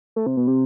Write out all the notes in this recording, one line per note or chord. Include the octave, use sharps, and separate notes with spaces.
A3
C3
B2
C3